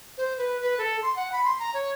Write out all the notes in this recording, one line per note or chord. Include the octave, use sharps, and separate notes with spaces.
C5
B4
B4
A4
C6
F#5
B5
C6
A#5
C#5